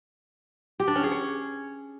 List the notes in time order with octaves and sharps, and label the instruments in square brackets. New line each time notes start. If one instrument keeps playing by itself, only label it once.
[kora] G4
D4
C#4
G#4
C#5